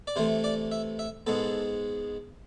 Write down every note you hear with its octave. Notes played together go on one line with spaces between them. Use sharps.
D5
C3 E3 A3 C5
D5
E5
E5
G#2 G#3 B3 A4